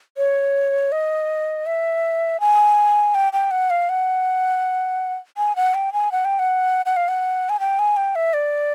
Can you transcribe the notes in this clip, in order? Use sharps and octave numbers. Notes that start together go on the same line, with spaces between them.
C#5
D#5
E5
G#5
G5
G5
F#5
F5
F#5
G#5
F#5
G5
G#5
F#5
G5
F#5
F#5
F5
F#5
G#5
G5
G#5
G5
E5
D5